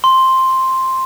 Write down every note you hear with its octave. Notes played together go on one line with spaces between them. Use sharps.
C6